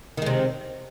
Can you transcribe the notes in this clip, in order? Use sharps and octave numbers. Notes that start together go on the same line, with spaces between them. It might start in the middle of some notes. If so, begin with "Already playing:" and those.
C3 D#3 G#3